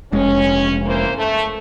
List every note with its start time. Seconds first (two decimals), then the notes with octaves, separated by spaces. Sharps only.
0.13 F1 G#3 C#4
0.86 E3 A#3 C5
1.18 A3